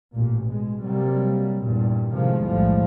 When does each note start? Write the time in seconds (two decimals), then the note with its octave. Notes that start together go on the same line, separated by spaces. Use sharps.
0.13 A1 A#2
0.44 B2 G#3
0.80 C3 F#3 G3 A#3
1.58 E2 G2 A#2
2.13 A2 C3 D#3 F3 G#3
2.44 B1 E2 A2 F3 G3 G#3